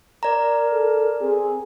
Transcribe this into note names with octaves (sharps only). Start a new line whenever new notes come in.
A#4 D5 A#5
A4
C4 G#4